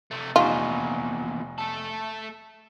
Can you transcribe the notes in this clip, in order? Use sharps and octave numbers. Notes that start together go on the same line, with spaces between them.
C3 A3
F1 E2 A#2 D#4 F4 C#6
A3 A4